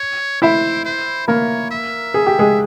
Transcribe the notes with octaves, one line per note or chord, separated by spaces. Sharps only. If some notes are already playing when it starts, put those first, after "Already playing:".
Already playing: C#5
E4 C5 E5
C5
A#3 A#4 C#5
E5
G#4
G4
G#3 G#4